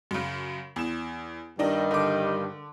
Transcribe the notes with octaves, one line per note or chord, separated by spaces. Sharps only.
F#2 C#3
E2 E7
G2 D#3 D4 D#4 D#5
D3 D6